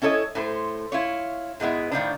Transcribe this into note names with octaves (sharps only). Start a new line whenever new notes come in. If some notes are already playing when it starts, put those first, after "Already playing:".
C#4 E4 A4 C#5 D#5
A2 A3 C5
E4 F4 C#5
G#2 G#3 B3 E4
A2 D#3 F3 D4